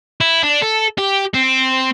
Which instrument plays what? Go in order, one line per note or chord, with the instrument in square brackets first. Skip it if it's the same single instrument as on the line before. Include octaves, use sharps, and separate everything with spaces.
[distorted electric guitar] E4
D4
A4
G4
C4